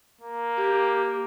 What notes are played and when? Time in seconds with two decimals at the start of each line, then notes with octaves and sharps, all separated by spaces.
0.21 A#3
0.57 G4